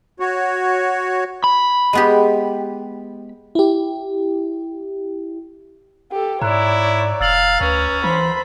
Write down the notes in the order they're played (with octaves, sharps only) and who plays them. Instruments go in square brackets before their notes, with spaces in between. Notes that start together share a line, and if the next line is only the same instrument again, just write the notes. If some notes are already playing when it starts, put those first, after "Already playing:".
[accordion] F#4 C#5
[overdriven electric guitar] B5
[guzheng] G#3 B3 G4
[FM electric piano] E4 G4
[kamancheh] G4 A4
[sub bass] G#2 [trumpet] E4 [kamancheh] C#5 D5 [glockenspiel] A#5 F#6
[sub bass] E1 [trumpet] F5 [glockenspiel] E6 A6 F#7
[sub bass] D2 [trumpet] C#4 [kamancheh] B4 [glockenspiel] A6
[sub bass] E3 [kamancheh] C5 B5